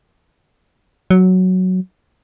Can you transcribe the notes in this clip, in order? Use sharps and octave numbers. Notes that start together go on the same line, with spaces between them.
F#3